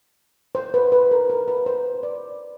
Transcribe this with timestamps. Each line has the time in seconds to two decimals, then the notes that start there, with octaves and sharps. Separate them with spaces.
0.55 C5
0.74 B4
0.92 B4
1.11 A#4
1.30 A#4
1.48 B4
1.66 C5
2.03 D5